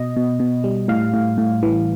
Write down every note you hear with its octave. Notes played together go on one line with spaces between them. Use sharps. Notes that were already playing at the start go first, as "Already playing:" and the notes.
Already playing: B2 D#5
B2
B2
G3
A2 F5
A2
A2
E3